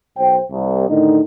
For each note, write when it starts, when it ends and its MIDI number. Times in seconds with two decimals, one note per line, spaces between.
0.18 0.38 35
0.18 0.38 72
0.18 0.38 79
0.51 0.87 36
0.89 1.19 45
0.89 1.19 50
0.89 1.19 51
0.89 1.19 63